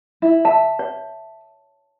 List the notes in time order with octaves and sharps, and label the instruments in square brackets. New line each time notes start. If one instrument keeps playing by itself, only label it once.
[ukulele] E4
[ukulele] E5 [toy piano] A5
[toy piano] C#5